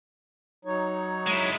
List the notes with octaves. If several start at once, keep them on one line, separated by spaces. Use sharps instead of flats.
F#3 D#4 C#5
G#3 E4